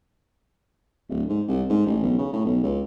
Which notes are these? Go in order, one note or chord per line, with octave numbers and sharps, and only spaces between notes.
D1
G#2
C2
G#2
A1
B1
C#3
A2
B1
C#2